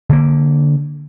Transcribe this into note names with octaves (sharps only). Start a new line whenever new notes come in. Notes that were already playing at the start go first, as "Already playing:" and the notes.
D3 A#3